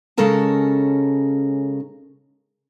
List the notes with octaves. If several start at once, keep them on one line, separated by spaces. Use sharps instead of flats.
C#3 G#3 C#4 A4 A#4 A5